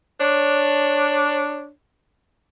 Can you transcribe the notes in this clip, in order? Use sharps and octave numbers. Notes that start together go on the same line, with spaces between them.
D4 C#5